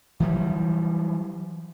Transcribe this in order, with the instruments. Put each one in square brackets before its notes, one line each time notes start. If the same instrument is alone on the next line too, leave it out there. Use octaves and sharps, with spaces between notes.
[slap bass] E3 F#3 G3